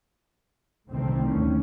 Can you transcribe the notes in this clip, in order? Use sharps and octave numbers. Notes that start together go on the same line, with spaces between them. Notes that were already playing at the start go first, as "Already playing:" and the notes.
C2 A2 D3 D#3 A3 C4
D#2 C#4